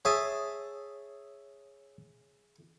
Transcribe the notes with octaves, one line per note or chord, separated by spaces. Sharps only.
G#4 C#5 E5 A5 D#6